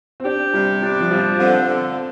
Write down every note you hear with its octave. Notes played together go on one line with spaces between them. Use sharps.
C4
D4 G4
C3 G3
G3 D4
F3
F3 G3
D3 C4
D3